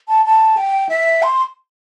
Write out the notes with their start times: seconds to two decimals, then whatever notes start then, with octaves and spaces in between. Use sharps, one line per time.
0.08 A5
0.25 A5
0.57 G5
0.89 E5
1.23 C6